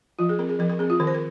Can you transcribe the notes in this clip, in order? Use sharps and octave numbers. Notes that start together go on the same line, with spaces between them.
F3 F4
G#4
C4 A#4
G#4
F3 A#4
A#4
C4 G#4
F4
D#3 A#4
C5
A#4